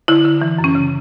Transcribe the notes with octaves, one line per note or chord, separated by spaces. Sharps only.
D3 E4
D3
E3
F#2
C#4
C#3